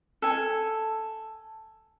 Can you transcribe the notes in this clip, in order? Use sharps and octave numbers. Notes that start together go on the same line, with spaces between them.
A4 G#5